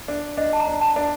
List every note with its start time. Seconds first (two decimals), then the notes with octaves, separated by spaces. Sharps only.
0.08 D4
0.37 D4 D#5
0.53 A5
0.60 A#5
0.67 D4
0.81 A5
0.96 D4